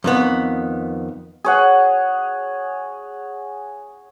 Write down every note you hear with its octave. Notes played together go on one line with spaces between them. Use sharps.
F2 D#3 B3
G#4 C#5 F#5